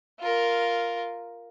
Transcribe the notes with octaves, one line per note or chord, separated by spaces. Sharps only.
F4 A#4